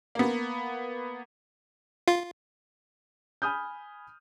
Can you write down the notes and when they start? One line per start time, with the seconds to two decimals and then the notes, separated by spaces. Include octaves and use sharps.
0.15 A#3 B3
2.08 F4
3.42 G#5 B5 D#6 F6 G6